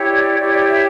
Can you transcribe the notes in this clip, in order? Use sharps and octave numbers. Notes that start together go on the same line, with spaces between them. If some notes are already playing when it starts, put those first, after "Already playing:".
Already playing: E4 G4 C#5
D5
E4 G4 C#5 D5
D5
E5